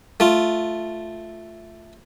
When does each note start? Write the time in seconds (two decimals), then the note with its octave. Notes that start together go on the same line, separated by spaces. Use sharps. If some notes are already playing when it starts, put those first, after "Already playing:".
0.20 A3 F4